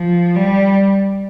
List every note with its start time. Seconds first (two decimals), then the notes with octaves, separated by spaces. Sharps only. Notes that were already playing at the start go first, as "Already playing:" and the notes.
Already playing: F3
0.36 G3